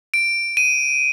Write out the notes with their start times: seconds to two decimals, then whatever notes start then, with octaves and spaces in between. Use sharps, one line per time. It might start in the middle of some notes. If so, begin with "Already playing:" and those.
0.14 D7
0.57 D#7